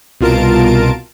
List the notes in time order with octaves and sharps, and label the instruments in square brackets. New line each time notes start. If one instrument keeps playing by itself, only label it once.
[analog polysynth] C2 B2 F4 A#4 A5 D7